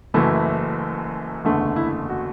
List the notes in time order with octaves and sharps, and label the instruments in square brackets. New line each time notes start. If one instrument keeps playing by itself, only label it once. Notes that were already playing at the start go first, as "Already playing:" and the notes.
[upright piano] F#1 F#2 E3 A3 E4
F#1 E2 D3 A3
E4
F#4